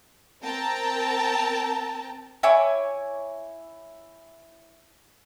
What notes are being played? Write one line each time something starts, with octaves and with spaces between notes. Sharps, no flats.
C4 A#4 G5 A5 A#5
E4 C#5 G#5 D6